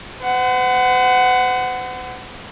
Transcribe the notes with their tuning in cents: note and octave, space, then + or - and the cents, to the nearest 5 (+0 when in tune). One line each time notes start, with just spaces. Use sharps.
C5 -45 F#5 +10